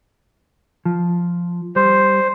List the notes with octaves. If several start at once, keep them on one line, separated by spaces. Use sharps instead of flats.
F3
G3 C5